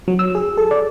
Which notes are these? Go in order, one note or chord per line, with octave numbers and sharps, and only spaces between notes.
F#3
E6
G#4
A4
D5